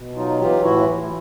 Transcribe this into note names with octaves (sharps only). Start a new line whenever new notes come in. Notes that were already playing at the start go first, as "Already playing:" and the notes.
Already playing: B2
F#3 D#4 F4
E3 F4 G4
A2 E4 F#4